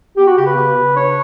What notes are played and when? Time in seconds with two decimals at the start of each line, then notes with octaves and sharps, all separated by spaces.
0.17 B3 G4
0.27 F#4
0.37 C#3 G4
0.47 B4
0.57 C#3
0.76 C#3
0.96 D4 C#5